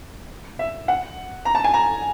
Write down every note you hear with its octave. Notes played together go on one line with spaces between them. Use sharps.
E5
F#5
A#5
A5
G#5
A#5